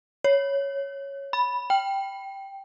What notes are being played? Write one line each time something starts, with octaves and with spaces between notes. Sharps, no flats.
C#5
B5
G5